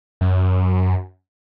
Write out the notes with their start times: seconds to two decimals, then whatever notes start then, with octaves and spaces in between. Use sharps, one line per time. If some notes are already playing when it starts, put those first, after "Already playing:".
0.21 F#2